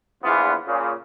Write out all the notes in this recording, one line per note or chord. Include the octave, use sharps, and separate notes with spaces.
A#1 E2 B3 E4 F4
A#2 C#3